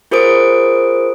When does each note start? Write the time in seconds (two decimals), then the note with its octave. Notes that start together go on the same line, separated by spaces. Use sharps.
0.11 F4 G#4 A#4 C5 D#6 D7